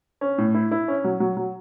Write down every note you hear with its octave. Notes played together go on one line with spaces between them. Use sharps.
C#4
A2
E4
E4
C#4
F#3
F#3
F#3